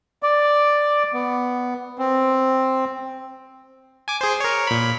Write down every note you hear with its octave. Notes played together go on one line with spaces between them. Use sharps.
D5
B3
C4
G#5 D6
G#4 C5
A#4 C#5
A#2 B5